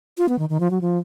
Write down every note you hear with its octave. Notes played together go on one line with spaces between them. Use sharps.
F4
B3
D#3
D#3
F3
F#3
F3